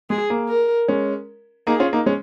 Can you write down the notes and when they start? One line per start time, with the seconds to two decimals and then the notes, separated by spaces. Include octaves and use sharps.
0.10 G#3 G#4
0.30 A#3
0.49 A#4
0.88 G#3 C#4
1.67 A#3 D#4 G#4
1.80 C#4 F4
1.93 A#3 D#4
2.06 G#3 C#4